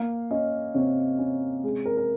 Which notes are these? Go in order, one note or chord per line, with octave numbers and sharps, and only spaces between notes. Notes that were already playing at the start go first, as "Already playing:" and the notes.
Already playing: A#3 F5
C#4 D#5
C3 C#5
C#4
G#3
A#4
A#4